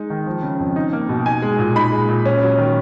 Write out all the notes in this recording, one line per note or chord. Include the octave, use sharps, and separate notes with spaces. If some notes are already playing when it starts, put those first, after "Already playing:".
Already playing: G#3 D#4
D#3
F3
C#3
F2
D#4
A#3
B2
D#4 G#5
G#3
A#2
D#4 B5
G#3
A#2
C#4
F#3
D#3